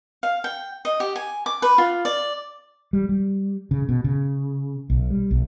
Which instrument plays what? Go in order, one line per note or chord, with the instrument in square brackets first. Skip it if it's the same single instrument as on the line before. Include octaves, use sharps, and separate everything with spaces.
[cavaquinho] F5
G5
D#5
G4
G#5
D6
B4
F4
D5
[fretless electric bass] G3
G3
C#3
B2
C#3
B1
G3
B1